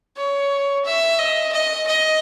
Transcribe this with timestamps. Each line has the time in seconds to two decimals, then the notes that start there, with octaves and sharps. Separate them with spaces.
0.17 C#5
0.85 E5
1.19 D#5
1.53 D#5
1.87 D#5